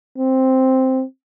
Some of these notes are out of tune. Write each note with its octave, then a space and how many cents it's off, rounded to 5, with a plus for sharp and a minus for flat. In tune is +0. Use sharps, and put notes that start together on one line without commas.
C4 +0